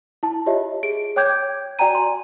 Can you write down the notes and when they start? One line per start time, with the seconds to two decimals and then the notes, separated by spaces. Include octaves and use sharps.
0.23 E4 A5
0.46 F4 G4 C#5 D#5 E5
0.83 G#4 D7
1.16 C#5 G5 D6 G6 G#6
1.79 F#4 D5 G5 G#5 A#5 D#7
1.95 C6